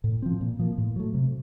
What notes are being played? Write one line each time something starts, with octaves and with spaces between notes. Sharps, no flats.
A2
F3 C4
A#2
F3 A#3
A2
F#3 A3
C3